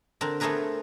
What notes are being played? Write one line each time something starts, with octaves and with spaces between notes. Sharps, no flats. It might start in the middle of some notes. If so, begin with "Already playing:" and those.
D3 C4 A#4
A3 B3 C4 G#4 A#4 B4